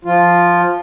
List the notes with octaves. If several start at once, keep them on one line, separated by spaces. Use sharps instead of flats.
F3 F4